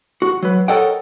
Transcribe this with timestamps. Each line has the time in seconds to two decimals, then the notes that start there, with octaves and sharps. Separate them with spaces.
0.22 F#4
0.42 F#3 B4
0.68 A4 A#4 C#5 D#5 F#5 G5